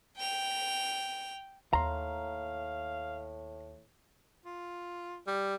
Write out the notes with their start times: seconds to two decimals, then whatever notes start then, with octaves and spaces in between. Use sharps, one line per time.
0.18 G5 F7
1.73 D#2 A2 F5 A#5 C6
4.46 F4
5.27 G3